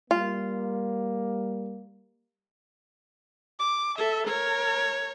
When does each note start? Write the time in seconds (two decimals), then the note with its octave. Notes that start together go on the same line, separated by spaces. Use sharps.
0.11 G3 A#3 F4
3.59 D6
3.98 A4 E5
4.27 A#4 C#5